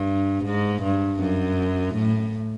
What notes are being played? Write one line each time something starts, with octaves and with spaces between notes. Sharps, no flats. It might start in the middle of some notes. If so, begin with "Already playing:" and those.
Already playing: G2
G#2
G2
F#2
A2